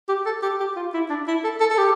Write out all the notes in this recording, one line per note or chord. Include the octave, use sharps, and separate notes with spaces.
G4
A4
G4
G4
F4
E4
D4
E4
A4
A4
A4
G4